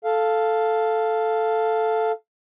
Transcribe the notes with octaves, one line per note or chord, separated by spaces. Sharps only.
A4 F5